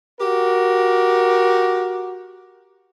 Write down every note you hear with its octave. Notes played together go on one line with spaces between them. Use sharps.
F#4 G4 A#4